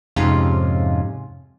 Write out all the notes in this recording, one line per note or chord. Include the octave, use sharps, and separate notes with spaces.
F2 G#2 C3 G#3 C#4 F4